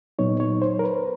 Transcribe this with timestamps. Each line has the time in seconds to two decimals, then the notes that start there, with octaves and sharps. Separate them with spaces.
0.19 A#2 F#3 B3 D#4 C#5
0.40 C#5
0.62 C5
0.79 A#4
0.84 B4